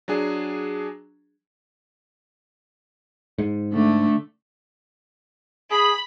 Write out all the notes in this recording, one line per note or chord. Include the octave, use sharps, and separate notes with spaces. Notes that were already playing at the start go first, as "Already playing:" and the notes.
F#3 D4 G#4
G#2
D3 A3
G#4 B5